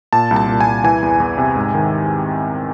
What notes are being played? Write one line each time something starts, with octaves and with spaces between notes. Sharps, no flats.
A#2 A5
C2
A5
A#2
G#5
C2
E3 G#5
E2
E2
C3
G#2
D#3